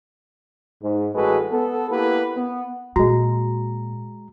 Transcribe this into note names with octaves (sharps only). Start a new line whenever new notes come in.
G#2
A1 G#3 F#4 A4 B4
B3 A4
A#3 B3 E4 G4 A4 B4
B3
A#2 G#3 F#4 A#5